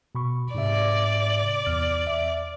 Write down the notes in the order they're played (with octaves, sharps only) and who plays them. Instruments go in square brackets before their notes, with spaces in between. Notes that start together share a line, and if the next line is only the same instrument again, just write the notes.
[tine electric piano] B2 B5 C#6
[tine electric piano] G#2 C3 E5 [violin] D5
[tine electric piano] E2 F6
E5